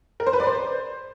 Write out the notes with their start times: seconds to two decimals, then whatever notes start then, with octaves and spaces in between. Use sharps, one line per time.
0.20 A#4
0.27 C5
0.33 B4
0.40 D5
0.47 C5